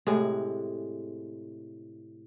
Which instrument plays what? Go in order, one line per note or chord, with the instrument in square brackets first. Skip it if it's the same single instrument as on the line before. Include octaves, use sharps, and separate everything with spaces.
[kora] A2 C3 G#3